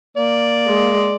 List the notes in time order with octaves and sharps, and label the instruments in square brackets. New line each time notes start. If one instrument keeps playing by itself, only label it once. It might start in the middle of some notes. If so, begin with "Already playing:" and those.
[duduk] A#3 [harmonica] D5
[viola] G#3